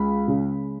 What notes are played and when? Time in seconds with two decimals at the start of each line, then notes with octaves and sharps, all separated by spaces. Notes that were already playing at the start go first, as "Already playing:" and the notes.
Already playing: C#2 G#3 B5
0.27 C#3